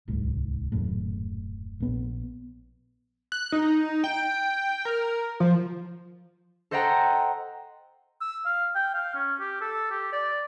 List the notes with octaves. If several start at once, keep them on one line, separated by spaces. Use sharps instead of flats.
D1 C2 G#2
D#1 F#2 A2
A#1 B3
F#6
D#4
G5
A#4
F3
A4 C5 D#5 F#5 G5 A#5
E6
F5
G5
F5
C#4
G4
A4
G4
D5